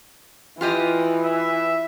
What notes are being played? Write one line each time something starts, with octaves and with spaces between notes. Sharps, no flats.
E3 F4 G4 D#5
E5